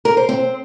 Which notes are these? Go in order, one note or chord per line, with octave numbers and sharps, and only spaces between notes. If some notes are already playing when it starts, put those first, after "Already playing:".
A#4
C5
C4